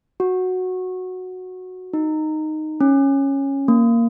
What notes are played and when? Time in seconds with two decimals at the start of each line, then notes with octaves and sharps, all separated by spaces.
0.20 F#4
1.93 D#4
2.81 C#4
3.68 A#3